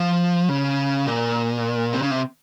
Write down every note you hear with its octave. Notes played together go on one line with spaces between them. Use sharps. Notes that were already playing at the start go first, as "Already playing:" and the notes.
Already playing: F3
C#3
A#2
C3
C#3
C3